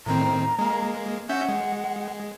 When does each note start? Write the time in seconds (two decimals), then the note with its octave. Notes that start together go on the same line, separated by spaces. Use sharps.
0.06 A2 D#3 C4 A#5
0.59 G#3 A#3
1.29 C#4 E5 F#5 G6
1.49 G#3